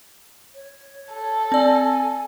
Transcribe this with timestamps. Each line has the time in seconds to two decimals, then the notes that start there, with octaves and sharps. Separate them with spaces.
0.55 C#5
1.13 A4
1.52 C4 D5 G#5